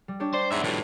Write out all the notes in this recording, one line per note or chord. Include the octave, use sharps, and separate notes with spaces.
G3
D4 G4 C#5
C5 D5
G#2 B3 E5
A2 F3 G3 B4